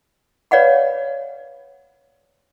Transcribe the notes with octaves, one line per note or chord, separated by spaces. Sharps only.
B4 C#5 D5 F5 F#5 B5